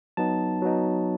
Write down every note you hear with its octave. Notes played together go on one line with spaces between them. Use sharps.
F#3 B3 D#4 A5
F#3 B3 D#4